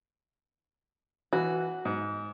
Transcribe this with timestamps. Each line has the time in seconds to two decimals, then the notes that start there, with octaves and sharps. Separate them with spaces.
1.33 E3 F#4
1.85 G#2